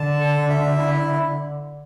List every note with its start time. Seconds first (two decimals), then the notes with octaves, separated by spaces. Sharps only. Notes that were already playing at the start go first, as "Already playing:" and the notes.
Already playing: D3 A5
0.20 A4
0.50 E5
0.79 E4